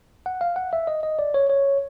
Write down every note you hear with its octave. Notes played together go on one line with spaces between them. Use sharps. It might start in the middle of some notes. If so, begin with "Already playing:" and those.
F#5
F5
F#5
E5
D#5
D#5
D5
C#5
C#5